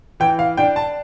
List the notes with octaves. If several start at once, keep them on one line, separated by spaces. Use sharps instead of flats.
E3 G5
F5
D4 G5
A5